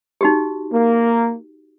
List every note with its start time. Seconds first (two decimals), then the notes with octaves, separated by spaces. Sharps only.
0.21 D#4 F#4 G4
0.72 A#3